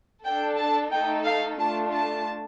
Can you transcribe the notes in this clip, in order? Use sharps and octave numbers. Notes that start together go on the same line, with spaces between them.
D4 A4 G5
A5
A3 D#4 A4 G5
F5
A3 D4 F4 A5
A5